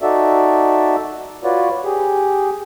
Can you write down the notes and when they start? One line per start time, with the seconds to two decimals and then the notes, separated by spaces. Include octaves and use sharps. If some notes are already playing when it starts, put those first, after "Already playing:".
0.02 D#4 F#4 A4 D5 E5
1.44 F4 F#4 B4 C#5 D5
1.85 G4 G#4